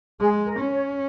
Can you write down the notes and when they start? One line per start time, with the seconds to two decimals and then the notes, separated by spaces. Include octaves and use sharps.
0.20 G#3 G#4
0.46 A#4
0.59 C#4
0.72 C#5